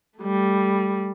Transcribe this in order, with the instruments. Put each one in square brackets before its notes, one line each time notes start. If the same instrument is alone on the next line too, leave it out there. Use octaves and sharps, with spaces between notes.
[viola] G3 A3